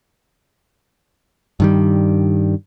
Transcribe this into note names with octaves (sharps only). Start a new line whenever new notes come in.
G2 D#3 G3